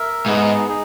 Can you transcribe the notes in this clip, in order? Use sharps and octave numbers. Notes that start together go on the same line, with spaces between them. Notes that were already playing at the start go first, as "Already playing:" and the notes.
Already playing: A#4 E5
G#2 B3 D#4 G#4
D#4 G#4